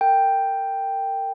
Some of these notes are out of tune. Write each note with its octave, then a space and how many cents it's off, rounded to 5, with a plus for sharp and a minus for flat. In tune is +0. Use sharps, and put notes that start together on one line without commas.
A#4 -30 G5 +0